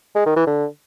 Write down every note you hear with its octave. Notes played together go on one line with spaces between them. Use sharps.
G#3
D#3
E3
D3